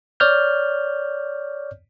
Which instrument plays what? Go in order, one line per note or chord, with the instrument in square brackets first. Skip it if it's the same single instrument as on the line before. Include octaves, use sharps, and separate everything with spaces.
[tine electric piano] C#5 D5 F6 G6